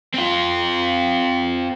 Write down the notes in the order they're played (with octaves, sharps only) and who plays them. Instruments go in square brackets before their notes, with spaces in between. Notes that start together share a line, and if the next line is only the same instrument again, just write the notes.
[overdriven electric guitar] C4 F4